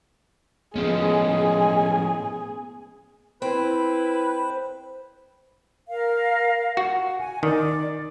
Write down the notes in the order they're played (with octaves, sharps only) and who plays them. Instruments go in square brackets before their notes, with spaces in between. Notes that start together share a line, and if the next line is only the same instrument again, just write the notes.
[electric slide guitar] A2 F3 C#4 [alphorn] G#3 [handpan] B3 [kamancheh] G#4
[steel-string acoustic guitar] C4 [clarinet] E4 [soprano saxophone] B4 [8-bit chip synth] C5
[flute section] A#4 F5
[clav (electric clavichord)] F#4
[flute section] F#5
G#5
[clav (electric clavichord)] D#3 [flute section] D5